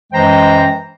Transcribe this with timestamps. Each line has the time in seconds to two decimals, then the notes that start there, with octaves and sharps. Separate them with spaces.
0.13 F#2 E3 G#3 C5 G5 A#5